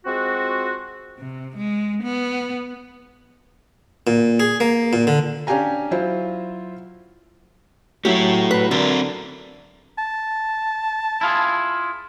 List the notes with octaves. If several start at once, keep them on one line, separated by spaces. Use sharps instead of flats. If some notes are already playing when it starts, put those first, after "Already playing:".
G#3 C4 F4 F#4
C3
G#3
B3
A#2
G#4
A#3
A#2
D3
C#4 D4 G4 F5 G#5 A#5
F#3 E4 F4 C5
F#3 A3 E4 G4
B4
D3 C4 A#4
A5
E4 F4 G#4